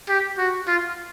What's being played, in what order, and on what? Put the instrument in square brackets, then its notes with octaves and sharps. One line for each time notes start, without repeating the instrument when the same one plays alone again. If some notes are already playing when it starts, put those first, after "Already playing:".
[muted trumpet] G4
F#4
F4